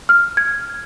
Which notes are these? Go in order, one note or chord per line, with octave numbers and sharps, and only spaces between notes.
F6
G#6